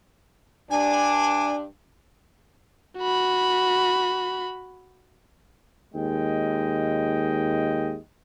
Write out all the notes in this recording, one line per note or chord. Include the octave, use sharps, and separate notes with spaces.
G2 D4 G#5
F#4 B5
D#2 G#3 D#5 G5